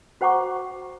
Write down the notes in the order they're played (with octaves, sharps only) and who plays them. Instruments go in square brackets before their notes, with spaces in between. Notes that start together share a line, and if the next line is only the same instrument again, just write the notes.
[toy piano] F#4 C5 F#5 A#5 C#6 D6